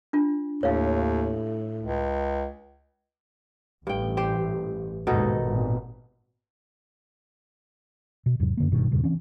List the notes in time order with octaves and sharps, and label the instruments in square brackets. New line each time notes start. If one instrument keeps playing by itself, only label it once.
[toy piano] D4 F4
[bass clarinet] D#2 [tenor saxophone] A2 [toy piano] C#5 F5
[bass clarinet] C#2
[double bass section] A1 [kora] G2 G5
[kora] G4 C5
[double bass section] A1 D#2 G#2 [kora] B2 D#4 A4
[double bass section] G#1 A#2
[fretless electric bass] B2
E2 G#2 C3 F#3
F#2 D3 A#3
G#1 G2 B2 D#3
E2 G2 A#2 C#3
E3 C4 C#4